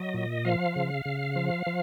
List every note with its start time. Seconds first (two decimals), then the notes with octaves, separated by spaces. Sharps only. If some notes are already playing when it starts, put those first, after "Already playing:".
Already playing: F#3 D#5
0.14 A#2
0.45 F3 F5
0.76 C#3
1.05 C#3
1.36 F3
1.66 F3